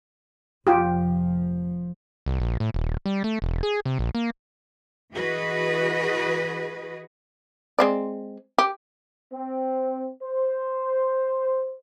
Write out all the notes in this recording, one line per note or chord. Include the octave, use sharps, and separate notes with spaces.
F1 F3 F4 G4
C2
A#1
A2
D#1
G3
A3
E1
G#4
C3
A#1
A#3
E3 F#4 G#4 B4 D#5
G#3 C4 D5
G4
C4
C5